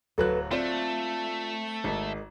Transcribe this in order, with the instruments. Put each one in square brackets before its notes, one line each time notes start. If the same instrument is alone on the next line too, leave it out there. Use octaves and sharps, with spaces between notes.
[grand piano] D1 F#3 F#6 [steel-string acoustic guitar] A4 B4
[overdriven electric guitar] A3 [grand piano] C4 [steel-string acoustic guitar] F4 D5
[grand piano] G#1 [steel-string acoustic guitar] D#3 G#3